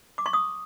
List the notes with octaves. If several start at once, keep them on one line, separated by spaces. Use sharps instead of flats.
D6
C#6
D#6